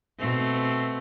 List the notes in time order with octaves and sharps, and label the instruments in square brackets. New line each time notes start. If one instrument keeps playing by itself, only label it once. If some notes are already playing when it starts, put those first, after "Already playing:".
[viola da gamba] B2 A3 C4